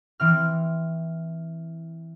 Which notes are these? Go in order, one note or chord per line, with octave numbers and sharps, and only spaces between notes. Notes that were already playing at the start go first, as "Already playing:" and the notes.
E3 C4 F6